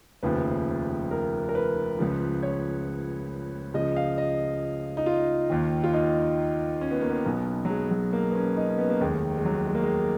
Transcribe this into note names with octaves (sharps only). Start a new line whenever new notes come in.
F1 D#2 C#3 F3 B4
A#4
A#4
B4
C#2 C#3 F3
C#5
C#2 C#3 F3 D#5
F5
D#5
D#4
F4
D#2 D#3
F4
D#4
C#4
B3
A#3
B3
B1 B2
F#3
G#3
F#3
A#3
B3
C#4
D#4
C#4
B3
A#3
F1 D#2 D#3 G#3
G#3
F#3
G#3
A#3
G#3